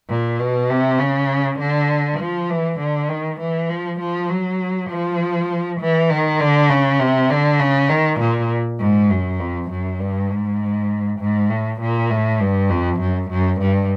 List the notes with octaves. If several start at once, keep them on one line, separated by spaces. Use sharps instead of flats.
A#2
B2
C3
C#3
D3
F3
E3
D3
D#3
E3
F3
F3
F#3
F3
E3
D#3
D3
C#3
C3
D3
C#3
D#3
A#2
G#2
F#2
F2
F#2
G2
G#2
G#2
A2
A#2
A2
G2
F2
F#2
F#2
G2